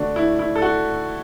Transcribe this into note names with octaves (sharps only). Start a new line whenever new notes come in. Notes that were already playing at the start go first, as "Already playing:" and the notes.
Already playing: D3 A3 D4 F#4
E4
E4
A4
F#4